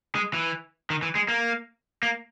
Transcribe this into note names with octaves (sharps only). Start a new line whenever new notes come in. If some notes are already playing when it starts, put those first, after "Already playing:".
G#3
E3
D#3
E3
G#3
A#3
A#3